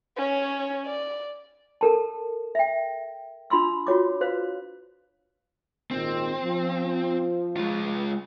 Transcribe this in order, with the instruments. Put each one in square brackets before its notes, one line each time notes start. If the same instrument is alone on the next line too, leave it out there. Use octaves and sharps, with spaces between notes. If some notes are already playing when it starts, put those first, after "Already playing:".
[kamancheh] C#4 C#5
D5
[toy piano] A4 A#4 A5
E5 G5
D4 F4 B5 C6 E6
F4 F#4 C#5 D6
B4 C5 F5
[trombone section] G#1 A#2 D#3 [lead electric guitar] C4
[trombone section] F3
[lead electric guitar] G#3 F4